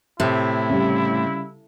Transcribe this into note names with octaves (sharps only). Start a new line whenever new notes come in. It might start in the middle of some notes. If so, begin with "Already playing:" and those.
A2 C3 E4
C#3 G3